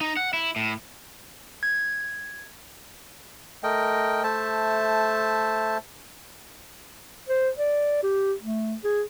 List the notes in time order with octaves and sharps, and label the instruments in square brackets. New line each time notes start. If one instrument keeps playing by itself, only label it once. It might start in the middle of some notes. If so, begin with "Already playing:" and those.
[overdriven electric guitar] D#4
F#5
E4
A2
[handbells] G#6
[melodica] A3 A#4 D#5 G5
A3 C5 E5 A5
[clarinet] C5
D5
G4
A3
G#4